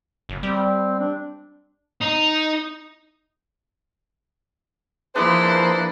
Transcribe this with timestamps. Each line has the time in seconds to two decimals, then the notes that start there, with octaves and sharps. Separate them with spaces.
0.29 F#1
0.43 G3 C4
0.99 D4
2.01 D#4
5.15 F3 A#3 D4 E4 G#4 B4 C5